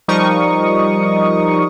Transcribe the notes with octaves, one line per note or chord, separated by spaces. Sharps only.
F3 G3 D#4 A#4 C#6 D#6